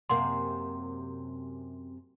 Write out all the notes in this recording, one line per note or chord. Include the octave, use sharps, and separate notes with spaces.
F#2 C3 A#3 C6